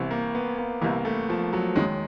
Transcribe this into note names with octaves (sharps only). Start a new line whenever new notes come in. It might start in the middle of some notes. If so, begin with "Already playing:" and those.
Already playing: C2 C3 E3
A#3
B3
A#3
C2 C3 E3 A#3
A3
F3
F#3
D#2 D#3 F#3 G#3